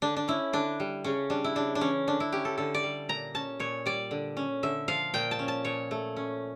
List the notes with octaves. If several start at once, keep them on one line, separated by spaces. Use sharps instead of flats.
D3 D4
D4
C#4 E4
D3 D4
G3
C#3 C#4
G3 D4
E4
C#3 D4
D4
E3 C#4
D3 D4
E4
C#4 G4
A4
D3 A4
D5
G3
A#2 A#5
C#4 A5
A#2 C#5
G3 D5
D3
C#4
D3 E5
F3 F5
A#2 G5
A5
C#4
A5
A#2 C#5
A3
C#4